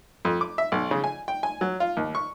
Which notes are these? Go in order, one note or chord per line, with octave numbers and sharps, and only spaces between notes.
F2
D6
E5
B1
C#3
G#5
G5
G#5
F#3
F4
D#2
C#6